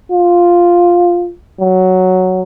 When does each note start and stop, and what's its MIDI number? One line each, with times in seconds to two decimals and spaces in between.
0.11 1.32 65
1.60 2.42 54